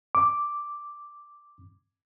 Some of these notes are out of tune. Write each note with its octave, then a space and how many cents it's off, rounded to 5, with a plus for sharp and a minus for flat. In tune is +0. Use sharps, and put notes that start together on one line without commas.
D6 +0